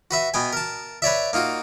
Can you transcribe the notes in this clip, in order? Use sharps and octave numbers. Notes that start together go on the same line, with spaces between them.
F#4 B4 E5
B2 B3 G5 G#5
A#4 A5
B4 C#5 D5 E5
A#3 D#4 F4 F#4